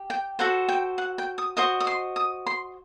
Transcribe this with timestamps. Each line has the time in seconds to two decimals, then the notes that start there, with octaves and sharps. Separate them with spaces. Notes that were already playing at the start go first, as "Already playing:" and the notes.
Already playing: G4
0.10 G5
0.39 F#4 A4 C5 F#5
0.68 G5
0.98 F#5
1.18 G5
1.38 D#6
1.57 F#4 C5 D#5 D#6
1.80 D#6
1.87 C6
2.16 D#6
2.46 C6